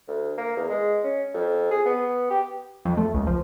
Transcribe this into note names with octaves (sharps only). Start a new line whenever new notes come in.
D2
A#3
E2
G#3
C#4
F2
G#4
B3
G4
F2
A3
C#2
F3